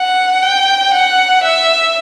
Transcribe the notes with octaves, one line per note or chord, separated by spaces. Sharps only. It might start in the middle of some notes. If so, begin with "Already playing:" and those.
Already playing: F#5
G5
F#5
E5